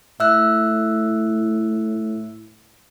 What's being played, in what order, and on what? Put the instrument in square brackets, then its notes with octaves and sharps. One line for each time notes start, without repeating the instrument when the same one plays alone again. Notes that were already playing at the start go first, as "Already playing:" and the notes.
[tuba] A2 [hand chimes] E5 E6 F#6